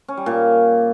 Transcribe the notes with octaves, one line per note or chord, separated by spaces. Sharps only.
C#4
G3
A#2